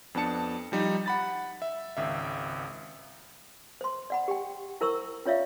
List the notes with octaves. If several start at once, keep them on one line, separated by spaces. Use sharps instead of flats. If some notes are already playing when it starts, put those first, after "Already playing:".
F2 B3 D4 A5 C#7
F3 G3 D#4
F#5 B5 A6
E5
G#1 C#2 E5
C5 C6
D5 F#5 B5
G4 G5
E4 A#4 C5 C#6 E6
C#4 F4 C#5 D5 E5 F5